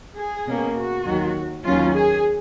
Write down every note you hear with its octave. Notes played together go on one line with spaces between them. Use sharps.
G#4
B2 A#3 C#4
F#4
D#2 D#3 F#3
D#2 D#3 F#3 C#4 F4
G#4